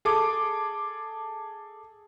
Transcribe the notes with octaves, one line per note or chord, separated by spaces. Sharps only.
G#4 A4 D6